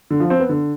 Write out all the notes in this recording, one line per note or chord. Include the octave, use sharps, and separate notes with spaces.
D3
F3
C4
B3
D3